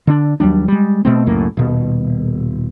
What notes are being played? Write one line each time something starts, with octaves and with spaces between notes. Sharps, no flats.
D3 D4
D#2 F#3 G3 D4
G3 G#3
B2 A3 C4
C#2 F#2 A2 A#3
D#1 B2